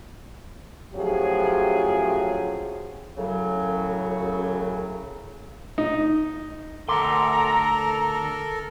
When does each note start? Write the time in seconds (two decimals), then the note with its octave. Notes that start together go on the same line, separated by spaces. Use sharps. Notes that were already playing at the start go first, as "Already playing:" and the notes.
0.95 A2 F3 F#3 C#4 G4 G#4
3.17 F#2 A2 C#3 F#3
5.78 D#4
6.89 D2 A4 A#4 A#5 C6 D6